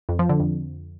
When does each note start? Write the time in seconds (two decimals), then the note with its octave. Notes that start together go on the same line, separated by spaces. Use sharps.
0.09 F2
0.19 F3
0.29 D3
0.40 F2